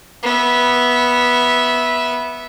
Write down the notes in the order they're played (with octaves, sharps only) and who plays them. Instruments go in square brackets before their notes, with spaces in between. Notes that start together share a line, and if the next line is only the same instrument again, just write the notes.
[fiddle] B3 E5